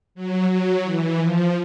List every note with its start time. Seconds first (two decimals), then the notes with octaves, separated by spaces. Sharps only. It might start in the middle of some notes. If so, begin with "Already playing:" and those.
0.15 F#3
0.49 F#3
0.83 E3
1.18 F3